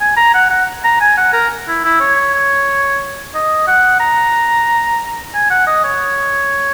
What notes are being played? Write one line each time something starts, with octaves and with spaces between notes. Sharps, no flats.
G#5
A#5
F#5
F#5
A#5
G#5
F#5
A#4
E4
E4
C#5
D#5
F#5
A#5
G#5
F#5
D#5
C#5